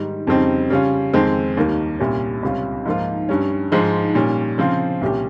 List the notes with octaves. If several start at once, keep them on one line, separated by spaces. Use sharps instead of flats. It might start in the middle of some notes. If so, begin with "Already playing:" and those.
Already playing: G#2 D#3 G3
F2 C#3 G3 C4 D#4
C#3 G3 C#4 F4
F2 D#3 G#3 C4
D#2 D#3 G3 A#3
C2 A#2 G3 C#4
C#2 C3 G3 C#4 F4
G#2 F3 A#3 F4
G2 G3 C#4
G#2 F3 G#3
A#2 G3 C#4
C#3 F3 C4 F4
C2 A#2 G3 C#4 G4